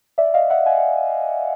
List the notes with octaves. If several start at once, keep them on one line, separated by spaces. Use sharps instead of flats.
D5 E5
D#5 F5
E5 F#5
F#5 G#5